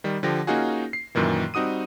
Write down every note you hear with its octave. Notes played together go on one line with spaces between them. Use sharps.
D#3 G3
D3 F3 G4 A#6
A#3 C#4 D#4 F4 F#4 G#4
C7
F#2 A#2 D#3 E3
G3 C4 D#4 F#4 D#6 D#7